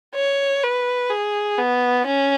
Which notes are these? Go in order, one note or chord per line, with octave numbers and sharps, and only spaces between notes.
C#5
B4
G#4
B3
C#4